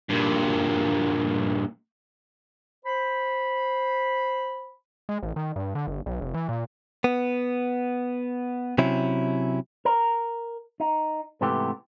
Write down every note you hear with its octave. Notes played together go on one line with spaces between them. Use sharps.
G2 A#2
C5 B5
G#3
A1
D#3
G2
D3
G1
B1
F1
E3
A#2
B3
C3 F#3 C#4 E4
A#4
D#4
G#2 C3 E3 A3 B3 G4